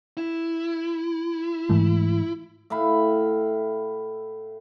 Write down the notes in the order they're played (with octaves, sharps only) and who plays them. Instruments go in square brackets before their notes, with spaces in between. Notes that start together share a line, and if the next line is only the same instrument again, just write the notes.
[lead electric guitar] E4
[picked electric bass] G#2 E3 A3
[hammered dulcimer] A2 E5 F5 B5